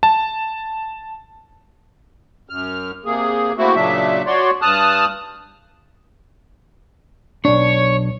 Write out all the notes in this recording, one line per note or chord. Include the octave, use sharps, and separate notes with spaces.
A5
F#2 F6
C3 A#3 G#4
A3 A#3 C4 E4 F#4
A#2 C#3 F#3 D4 E5
F#4 C#5 D5 C6
G2 A5 D#6 F6 F#6
B1 D4 C#5